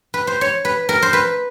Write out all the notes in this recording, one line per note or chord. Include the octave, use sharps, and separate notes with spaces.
B4
C5
C#5
B4
A#4
C5
B4